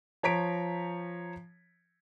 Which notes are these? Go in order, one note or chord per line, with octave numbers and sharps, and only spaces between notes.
F3 C#5 A#5 B6 D7